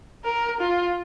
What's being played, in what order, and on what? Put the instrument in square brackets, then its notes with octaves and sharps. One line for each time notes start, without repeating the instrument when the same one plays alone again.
[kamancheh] A#4
F4